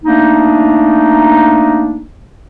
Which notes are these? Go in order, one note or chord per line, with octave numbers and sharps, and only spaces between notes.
A3 A#3 D4 D#4